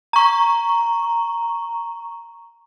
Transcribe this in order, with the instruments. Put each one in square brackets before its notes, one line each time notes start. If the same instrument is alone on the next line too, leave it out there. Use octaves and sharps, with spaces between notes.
[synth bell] A#5 C#6